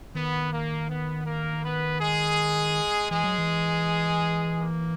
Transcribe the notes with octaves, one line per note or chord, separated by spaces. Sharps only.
D#3 B3
A#3
B3
A#3 A#4
B3 B4
G#3 G#4
E3 G#3 G#4
F#3
E3
A#3